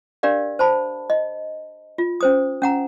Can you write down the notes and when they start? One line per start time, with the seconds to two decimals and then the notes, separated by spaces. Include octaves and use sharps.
0.23 D4 G4 A#4 D5 F5
0.59 C5 A5 B5
1.10 D#5
1.98 F4
2.21 C#4 C5 D#6
2.62 C#4 F#5 A#5